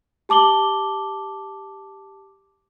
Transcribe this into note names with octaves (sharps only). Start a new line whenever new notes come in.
G4 A5 D6 F#7 G7